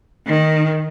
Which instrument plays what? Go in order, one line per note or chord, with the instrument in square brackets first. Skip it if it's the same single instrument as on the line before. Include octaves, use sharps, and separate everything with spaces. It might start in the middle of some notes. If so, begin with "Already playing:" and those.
[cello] D#3